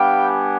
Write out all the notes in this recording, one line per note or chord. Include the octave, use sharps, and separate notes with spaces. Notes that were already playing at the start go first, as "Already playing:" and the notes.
Already playing: G3 B3 D4 G4 F5 G5
F#5 G#5